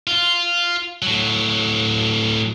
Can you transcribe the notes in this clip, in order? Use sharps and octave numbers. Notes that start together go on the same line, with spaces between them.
F4
A2 F#3